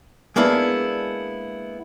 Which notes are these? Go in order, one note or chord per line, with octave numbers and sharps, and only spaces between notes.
G#3 A#3 B3 D4 E4